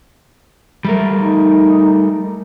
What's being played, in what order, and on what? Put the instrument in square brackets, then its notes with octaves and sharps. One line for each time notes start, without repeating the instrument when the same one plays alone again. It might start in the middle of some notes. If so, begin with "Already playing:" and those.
[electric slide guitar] G3 A3 A#4
[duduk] D#4